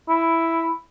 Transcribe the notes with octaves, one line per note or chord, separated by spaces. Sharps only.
E4